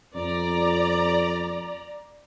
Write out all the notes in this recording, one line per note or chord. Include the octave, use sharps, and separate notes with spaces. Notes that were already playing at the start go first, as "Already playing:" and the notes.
F2 D5 A#5